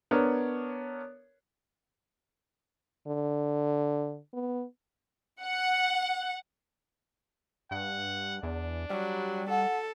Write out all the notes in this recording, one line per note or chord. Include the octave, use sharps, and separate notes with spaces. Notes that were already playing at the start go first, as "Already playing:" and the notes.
B3 D4 A#4 C#5
D3
B3
F#5
G2 F#5
E2 D4
F#3 G3
A4 F#5